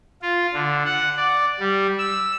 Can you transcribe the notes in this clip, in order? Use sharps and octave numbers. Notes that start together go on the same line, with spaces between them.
F4
D3
F#5
D5
G3
E6